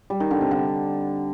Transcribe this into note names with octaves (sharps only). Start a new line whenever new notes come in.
G3
D#3
D3
C3
D3